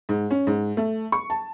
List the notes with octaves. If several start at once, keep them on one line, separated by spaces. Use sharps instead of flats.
G#2
C#4
G#2
A3
C#6
A5